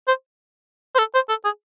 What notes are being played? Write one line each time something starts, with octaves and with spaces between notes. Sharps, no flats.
C5
C5
A4
C5
A4
G#4